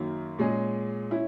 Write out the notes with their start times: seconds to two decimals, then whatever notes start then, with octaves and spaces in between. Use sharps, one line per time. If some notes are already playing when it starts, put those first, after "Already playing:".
Already playing: F#2 D#3 F#3 A#3
0.38 A#2 G#3 C#4 G#4
1.11 C#4 E4